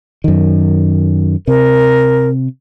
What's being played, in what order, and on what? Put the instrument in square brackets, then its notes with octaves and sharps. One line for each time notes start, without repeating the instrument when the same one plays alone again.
[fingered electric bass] F#2 D#3
[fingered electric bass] C3 [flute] A#4